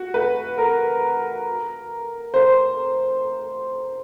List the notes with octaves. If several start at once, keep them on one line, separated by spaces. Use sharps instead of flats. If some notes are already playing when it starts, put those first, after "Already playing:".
Already playing: F#4
B4
A#4
C5